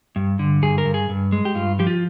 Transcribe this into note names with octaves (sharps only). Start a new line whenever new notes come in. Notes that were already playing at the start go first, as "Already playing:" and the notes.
G2
D3
G2 G#4
A#4
G2
G#4
G2
G#3
G4
G2 F4
F3 G4
F4